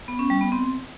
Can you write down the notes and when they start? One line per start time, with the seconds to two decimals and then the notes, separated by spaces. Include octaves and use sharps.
0.08 B3
0.19 C#4
0.30 G3
0.41 B3
0.52 C4